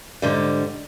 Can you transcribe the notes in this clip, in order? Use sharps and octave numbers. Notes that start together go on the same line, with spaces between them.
G#2 D3 G3